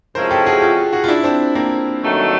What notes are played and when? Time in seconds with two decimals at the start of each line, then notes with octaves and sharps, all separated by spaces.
0.15 C3 F3 G#3 C#4 E4 A#4 C5
0.31 G4 A4
0.46 F#4 G#4
0.62 F4 G4
0.93 F#4 G#4
1.04 F4
1.08 D4 E4
1.24 C4 D4
1.55 A#3 C4
2.01 G2 D#3 F#3 A3